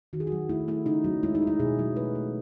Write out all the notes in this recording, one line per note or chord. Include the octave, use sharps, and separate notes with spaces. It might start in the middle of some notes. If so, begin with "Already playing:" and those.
D#3 F#4
G#4
F#3 F#4
A3 E4
A3 E4
C#3 D#4
F#3
G#3 E4
D#4
G#3 E4
B2 G#4
F#3
A3 B4
A3